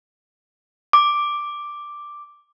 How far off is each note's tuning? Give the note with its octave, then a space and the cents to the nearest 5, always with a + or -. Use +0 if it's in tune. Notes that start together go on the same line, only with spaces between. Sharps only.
D6 +0